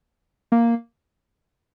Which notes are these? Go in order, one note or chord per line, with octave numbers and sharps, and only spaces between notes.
A#3